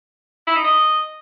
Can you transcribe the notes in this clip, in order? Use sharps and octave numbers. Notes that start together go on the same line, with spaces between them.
E4
D#4
D#5